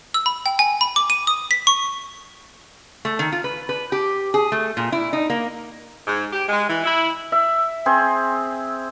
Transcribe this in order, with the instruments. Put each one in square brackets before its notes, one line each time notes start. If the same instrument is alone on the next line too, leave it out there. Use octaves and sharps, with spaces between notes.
[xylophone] E6
B5
G5
G#5
B5
D6
D#7
D#6
B6
C#6
[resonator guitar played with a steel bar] A3
D#3
F4
B4
B4
G4
G#4
A3
A#2
E4
D#4
A#3
[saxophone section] G#2
G4
G#3
E3
E4
[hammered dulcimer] E5
C4 G#4 C5